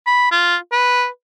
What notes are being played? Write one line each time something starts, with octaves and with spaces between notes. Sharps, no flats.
B5
F4
B4